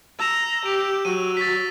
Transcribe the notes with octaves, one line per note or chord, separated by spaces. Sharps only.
A#5 E6 E7
G4 D7 F7
F#3 D#7
A6 B6